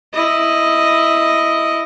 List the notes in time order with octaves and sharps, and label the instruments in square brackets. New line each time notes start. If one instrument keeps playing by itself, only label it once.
[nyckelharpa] E4 D#5